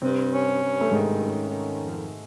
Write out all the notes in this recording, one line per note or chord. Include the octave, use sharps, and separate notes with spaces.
G2 C3 C4
C#4
G2
A3
G#2 D#3 G#3
C#4
D#3
F2